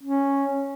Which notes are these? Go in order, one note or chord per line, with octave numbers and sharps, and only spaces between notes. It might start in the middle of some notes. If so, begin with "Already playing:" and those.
C#4